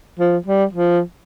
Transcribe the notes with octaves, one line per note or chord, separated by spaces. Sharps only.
F3
G3
F3